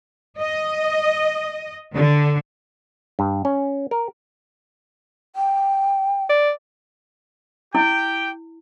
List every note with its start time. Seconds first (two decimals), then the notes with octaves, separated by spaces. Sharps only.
0.41 D#5
1.96 D3
3.19 G2
3.45 C#4
3.91 A#4
5.36 G5
6.29 D5
7.75 E4 G4 G5